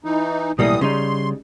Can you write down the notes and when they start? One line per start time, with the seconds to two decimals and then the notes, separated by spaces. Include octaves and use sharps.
0.04 E3 D#4
0.59 B1 A2 E3 G3 A#3 D#6
0.81 C#3 G3 D#4 C6